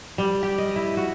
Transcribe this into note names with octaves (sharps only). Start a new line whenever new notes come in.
G3
G4
D#5
E4
F#4